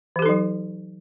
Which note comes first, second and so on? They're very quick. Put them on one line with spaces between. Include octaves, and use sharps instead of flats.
E3 G4 A4 D#4 F#3